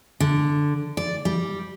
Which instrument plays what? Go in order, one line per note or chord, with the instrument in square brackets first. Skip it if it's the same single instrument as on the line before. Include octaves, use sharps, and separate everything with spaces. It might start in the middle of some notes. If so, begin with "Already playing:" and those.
[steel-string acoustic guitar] D3
D5
G3